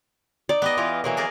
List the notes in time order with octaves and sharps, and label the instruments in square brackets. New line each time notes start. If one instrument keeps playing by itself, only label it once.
[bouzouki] D#4 [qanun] D5
[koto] B3 G4 D#5
[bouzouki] E3 F4
E3 F#3 A#3
[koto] G#4 A#4 D5